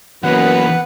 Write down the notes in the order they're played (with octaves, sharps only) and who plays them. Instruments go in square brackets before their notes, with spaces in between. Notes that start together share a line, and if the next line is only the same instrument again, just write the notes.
[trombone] F#2 [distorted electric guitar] E3 A#3 [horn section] B3 B4 [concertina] F#5